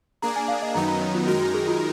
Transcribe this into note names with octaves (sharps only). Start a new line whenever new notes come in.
A#3 D4 G#4 A#5
G#5
F5
D#5
F#2 D#3 F#3 B3 D#4 A#5
A#5
D#5
F4
F#2 D#3 G#3 D#4 F#4 A#4
F#4
G#4
F4